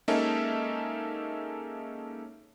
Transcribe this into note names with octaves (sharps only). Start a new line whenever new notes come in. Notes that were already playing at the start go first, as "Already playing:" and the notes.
G#3 A#3 C#4 D#4 A4 E5